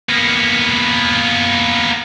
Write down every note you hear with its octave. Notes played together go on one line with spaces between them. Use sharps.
A#3 B3